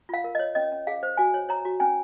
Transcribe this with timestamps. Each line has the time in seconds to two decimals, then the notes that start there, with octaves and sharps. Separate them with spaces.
0.09 F4 F5
0.24 A#4
0.35 D#5
0.39 C#5
0.55 C#4 D#5
0.72 C#4
0.87 G#4 F5
1.03 C5
1.17 F#4 G#5
1.34 C#5
1.49 C#5 A#5
1.65 F#4
1.80 C#4 G#5